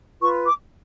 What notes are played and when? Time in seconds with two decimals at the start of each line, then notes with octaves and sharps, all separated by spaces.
0.21 F4 B4 C#6
0.46 D6